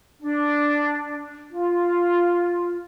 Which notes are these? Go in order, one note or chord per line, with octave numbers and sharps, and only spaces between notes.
D4
F4